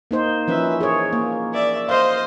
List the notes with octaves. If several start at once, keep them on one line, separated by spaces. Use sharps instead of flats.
A#3 D#4 C5
E3 F3 C#4 B4 E5
G#4 A#4 C#5
A#3
D5 E5
C5 D#5 F5